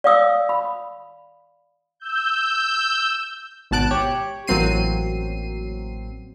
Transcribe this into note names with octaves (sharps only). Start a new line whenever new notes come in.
D5 F5 D#6 E6
B5
E6 G6
G#1 B2 A5 F#6 D7
G4 C#5
A1 F#3 A#3 C4 C7 D#7